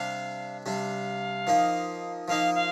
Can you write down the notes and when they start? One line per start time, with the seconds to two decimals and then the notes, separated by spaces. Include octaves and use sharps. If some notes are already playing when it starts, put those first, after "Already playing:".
Already playing: C3 G3 D4 F5
0.66 C3 G3 D4 F5
1.47 F3 A#3 D#4
2.28 F3 A#3 D#4 F5
2.55 F5